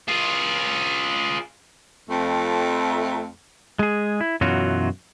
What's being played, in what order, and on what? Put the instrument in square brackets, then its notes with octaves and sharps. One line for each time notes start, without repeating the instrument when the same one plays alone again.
[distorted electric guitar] F4 G#4
[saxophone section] F2 A3
[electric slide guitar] G#3 G#4
E4
F#2 B2 E3 F#3 F4 F#4